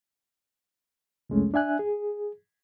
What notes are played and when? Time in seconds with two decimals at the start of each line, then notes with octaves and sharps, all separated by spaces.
1.30 C2 F2 G#3 A3 C#4
1.54 D4 E5 G#5 F#6
1.79 G#4